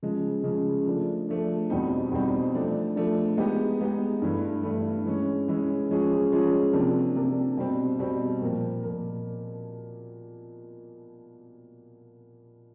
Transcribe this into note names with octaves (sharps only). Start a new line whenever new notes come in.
C#3 F3 G#3
C#3 F3 G#3
F3 A3 D4
F3 A3 D4
E2 B2 G3 C4 D#4
E2 B2 G3 C4 D#4
F3 A3 D4
F3 A3 D4
G#3 B3 D#4 G4
G#3 B3 D#4 G4
G2 E3 A3
G2 E3 A3
E3 G#3 C#4
E3 G#3 C#4
F3 G#3 C#4 F4 G#4
F3 G#3 C#4 F4 G#4
C3 F3 A#3 D4
C3 F3 A#3 D4
B2 G3 C4
B2 G3 C4
A#2 F3 A#3
A#2 F3 A#3